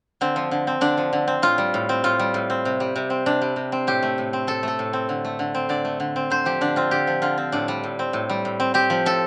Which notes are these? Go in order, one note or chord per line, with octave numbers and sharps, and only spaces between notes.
D3 C4
F3
D3
C4
D3 D4
F3
D3
C4
A2 F4
G3
A2
C4
A2 F4
G3
A2
C4
C3
G3
C3
C4
C3 D4
G3
C3
C4
A2 G4
A3
A2
C4
A2 A4
A3 A4
A2
C4
D3
A3
D3
C4
D3 D5
A3
D3
C4
D3 C5
F3 G4
D3 D4
C4 F4
D3 G4
F3
D3 F4
C4
A2 D4
G3
A2
C4
A2
G3
A2
C4
C4 G4
F3
A2 A4